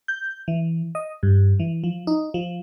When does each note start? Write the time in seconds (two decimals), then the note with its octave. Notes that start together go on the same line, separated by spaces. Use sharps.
0.08 G6
0.48 E3
0.95 D#5
1.23 G2
1.60 E3
1.84 F3
2.07 D#4
2.34 F3